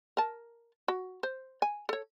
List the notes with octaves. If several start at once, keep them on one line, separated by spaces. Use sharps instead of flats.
A#4 A5
F#4
C5
G#5
A4 C#5